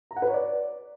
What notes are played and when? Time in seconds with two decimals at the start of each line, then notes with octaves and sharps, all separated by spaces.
0.11 A#5
0.16 F#5
0.22 B4
0.28 C#5
0.34 D5